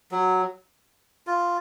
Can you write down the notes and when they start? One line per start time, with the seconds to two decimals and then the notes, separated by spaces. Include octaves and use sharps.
0.11 F#3
1.27 F4